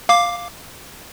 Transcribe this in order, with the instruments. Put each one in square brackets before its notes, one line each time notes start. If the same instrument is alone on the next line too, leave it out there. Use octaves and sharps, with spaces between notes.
[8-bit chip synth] F5 D6